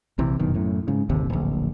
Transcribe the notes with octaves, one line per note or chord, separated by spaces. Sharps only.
A#1 C3 E3
F1 F#2 B2 D#3
F#2 A2
G#2 C#3
D1 G1 D#2 C3
D1 A#1